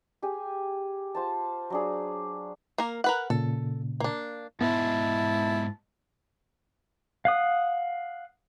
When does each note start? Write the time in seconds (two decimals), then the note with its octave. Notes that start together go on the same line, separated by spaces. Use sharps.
0.22 G4 G#4 G#5
1.15 F4 C5 A5
1.70 F#3 D4 G#4
2.78 A#3 A#4
3.04 A#4 B4 F#5
3.30 A#2 C#3 A4
4.00 A#3 D4
4.61 G#2 B2 B3 E4 A5
7.25 F5 F#5 D#6